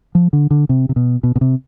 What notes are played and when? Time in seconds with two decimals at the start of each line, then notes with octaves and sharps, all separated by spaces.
0.15 F3
0.33 D3
0.51 D3
0.69 C3
0.89 C3
0.96 B2
1.23 B2
1.36 B2
1.41 C3